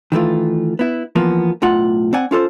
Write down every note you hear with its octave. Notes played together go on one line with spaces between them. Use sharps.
D#3 E3 A3 F4
B3 E4
E3 F3 A#3 B3
B1 A2 F4 F#5
C4 D5 F#5 G#5
C#4 F4 A4 C5